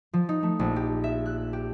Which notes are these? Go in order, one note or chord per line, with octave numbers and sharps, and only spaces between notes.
F3
D#4
A3
A#1
G4
E5
F#6
G4